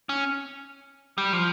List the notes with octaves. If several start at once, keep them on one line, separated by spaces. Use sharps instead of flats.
C#4
G3
F3